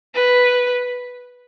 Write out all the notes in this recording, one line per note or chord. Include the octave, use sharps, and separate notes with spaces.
B4